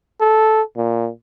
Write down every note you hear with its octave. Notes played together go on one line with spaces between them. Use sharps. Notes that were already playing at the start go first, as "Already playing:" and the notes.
A4
A#2